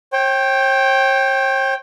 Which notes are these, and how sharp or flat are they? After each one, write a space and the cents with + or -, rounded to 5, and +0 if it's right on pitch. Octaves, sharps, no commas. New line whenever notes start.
C#5 -45 G5 +0